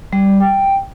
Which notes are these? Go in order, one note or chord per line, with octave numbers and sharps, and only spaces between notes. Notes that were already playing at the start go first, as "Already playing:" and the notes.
G3
G5